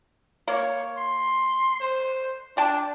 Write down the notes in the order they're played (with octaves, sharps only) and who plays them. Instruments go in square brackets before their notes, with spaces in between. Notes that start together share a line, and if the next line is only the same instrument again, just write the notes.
[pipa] A#3 [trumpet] C#5
[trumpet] C6
C5
[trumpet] D4 [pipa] D5 G5 A5